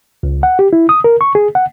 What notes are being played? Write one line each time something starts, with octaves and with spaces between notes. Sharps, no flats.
C#2
F#5
G4
E4
D#6
A#4
C#6
G#4
F#5